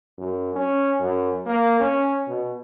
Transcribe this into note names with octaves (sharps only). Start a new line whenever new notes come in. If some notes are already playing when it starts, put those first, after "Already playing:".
F#2
C#4
F#2
A#3
C#4
B2